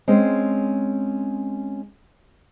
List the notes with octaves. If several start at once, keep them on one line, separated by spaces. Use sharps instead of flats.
G#3 C4 C#4